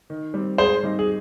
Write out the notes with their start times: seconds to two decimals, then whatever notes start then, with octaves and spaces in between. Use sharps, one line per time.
0.10 D#3
0.34 G3 C4
0.58 G#2 G#4 C5
0.83 D#3 G3 C4 D#4
0.99 G#4